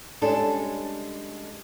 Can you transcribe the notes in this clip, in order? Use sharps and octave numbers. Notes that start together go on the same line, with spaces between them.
G3 G#3 C#4 D4 A4